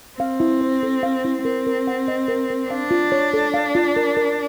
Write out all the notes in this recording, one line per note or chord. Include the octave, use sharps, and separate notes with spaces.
C4 F5
E4
C5
A4
F5
E4
C4 A#4
A#4
F#5
D#5
A#4
A#4
D4 F5
F4
C#5
A4
F5
F4
A#4
A#4